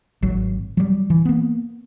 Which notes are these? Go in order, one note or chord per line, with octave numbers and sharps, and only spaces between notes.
G#1 F#3
F#3 G3
E3
A#3 B3